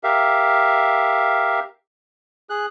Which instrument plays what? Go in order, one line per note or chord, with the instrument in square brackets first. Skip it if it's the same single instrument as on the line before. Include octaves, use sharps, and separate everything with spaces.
[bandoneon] G4 A#4 E5 F5
G#4 F#6